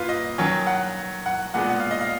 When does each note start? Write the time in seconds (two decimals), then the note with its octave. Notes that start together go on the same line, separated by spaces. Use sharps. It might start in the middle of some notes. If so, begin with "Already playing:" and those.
Already playing: A#3 F4 B4
0.09 D#5
0.38 D#3 F#3 C#4
0.67 F#5
1.26 F#5
1.54 A#2 G#3 B3 F#5
1.70 F#5
1.80 F5
1.91 D#5
2.01 F5